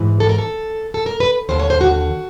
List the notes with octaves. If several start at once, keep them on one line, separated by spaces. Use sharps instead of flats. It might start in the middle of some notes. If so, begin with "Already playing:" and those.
Already playing: G#2 E3
A4
A#4
A4
A4
A#4
B4
D#2 D3 C5
C#5
C5
F#4
F#4